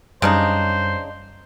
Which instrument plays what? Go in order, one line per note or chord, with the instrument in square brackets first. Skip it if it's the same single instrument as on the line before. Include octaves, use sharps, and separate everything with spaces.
[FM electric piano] F#2 G3 [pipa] C#3 D4 D#4 [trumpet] C5